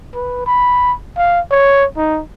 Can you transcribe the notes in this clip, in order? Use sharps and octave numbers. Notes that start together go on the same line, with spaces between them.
B4
B5
F5
C#5
D#4